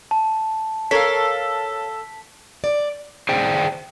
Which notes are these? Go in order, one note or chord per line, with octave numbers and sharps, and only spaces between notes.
A5
A4 A#4 C#5 F5 B6
D5
G#4 C5 D5 G5